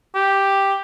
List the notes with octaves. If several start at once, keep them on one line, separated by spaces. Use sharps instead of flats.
G4